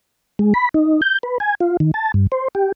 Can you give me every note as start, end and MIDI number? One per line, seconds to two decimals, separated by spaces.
0.39 0.53 56
0.54 0.69 83
0.74 1.01 63
1.02 1.19 91
1.23 1.38 71
1.40 1.55 80
1.60 1.77 65
1.80 1.91 51
1.94 2.12 81
2.14 2.27 43
2.32 2.48 72
2.55 2.72 67